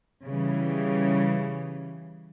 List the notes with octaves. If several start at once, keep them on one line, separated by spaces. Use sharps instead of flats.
C#3 E3 G3